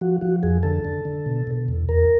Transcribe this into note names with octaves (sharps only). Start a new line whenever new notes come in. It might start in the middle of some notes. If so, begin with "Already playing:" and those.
F3 F#4
F3 F#4
F2 G#4
D3 A4
D3
D3
B2
B2
E2
E2 A#4